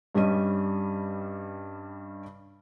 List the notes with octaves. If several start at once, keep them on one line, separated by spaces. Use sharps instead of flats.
G2 G3 C#4 D#5 D#7